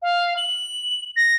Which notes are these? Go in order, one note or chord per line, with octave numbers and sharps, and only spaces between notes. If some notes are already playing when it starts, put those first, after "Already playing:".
F5
F#7
A#6